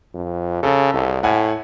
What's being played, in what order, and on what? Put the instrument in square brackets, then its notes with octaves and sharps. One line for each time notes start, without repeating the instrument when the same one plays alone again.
[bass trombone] F2
[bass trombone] C#3 [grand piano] A4
[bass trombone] C2
[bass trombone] A2 [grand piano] F#5 G#5